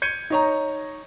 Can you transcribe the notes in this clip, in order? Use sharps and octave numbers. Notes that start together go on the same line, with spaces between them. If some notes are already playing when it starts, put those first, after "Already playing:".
G6 G#6 C#7 D#7
D#4 C#5 A#5